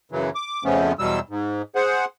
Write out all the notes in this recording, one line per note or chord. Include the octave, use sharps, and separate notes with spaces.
F#2 C#3 E3 F#3
D6
F2 C#3 F3 A3 B3 C#4
E2 B2 F#3 G3 E6
G#2
G#4 C5 F#5